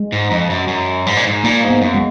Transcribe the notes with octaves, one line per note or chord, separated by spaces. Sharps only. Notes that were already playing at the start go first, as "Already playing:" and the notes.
Already playing: G#3
G#2
F2
F#2
F#2
G#2
A#2
G#2
A#2 A#3
G#2
B3
F#2
G#3